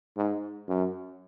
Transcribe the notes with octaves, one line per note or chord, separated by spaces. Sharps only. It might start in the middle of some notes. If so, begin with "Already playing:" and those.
G#2
F#2